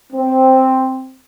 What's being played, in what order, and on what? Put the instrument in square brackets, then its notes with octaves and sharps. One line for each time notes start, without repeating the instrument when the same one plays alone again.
[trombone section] C4